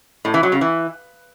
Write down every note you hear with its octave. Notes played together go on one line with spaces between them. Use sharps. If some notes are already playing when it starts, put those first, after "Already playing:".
A2
E3
F#3
C#3
E3